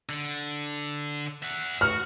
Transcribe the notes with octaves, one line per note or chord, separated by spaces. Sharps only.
D3
E5 F#5
F#4 F6